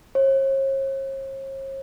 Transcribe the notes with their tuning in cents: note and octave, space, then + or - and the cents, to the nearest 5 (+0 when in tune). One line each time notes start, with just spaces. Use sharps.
C#5 -45